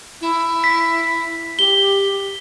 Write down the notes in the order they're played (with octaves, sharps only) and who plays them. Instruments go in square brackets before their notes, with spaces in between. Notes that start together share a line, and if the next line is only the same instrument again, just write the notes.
[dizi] E4
[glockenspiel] B6
[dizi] G4 [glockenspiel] G7